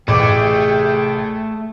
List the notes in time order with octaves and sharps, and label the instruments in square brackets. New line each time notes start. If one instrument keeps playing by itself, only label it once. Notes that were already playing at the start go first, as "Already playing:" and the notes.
[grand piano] A1 [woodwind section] C3 G#4 G5 [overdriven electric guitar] A3 [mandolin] C#5 D5 D6